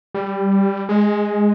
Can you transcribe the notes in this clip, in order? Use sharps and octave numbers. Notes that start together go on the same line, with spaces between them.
G3
G#3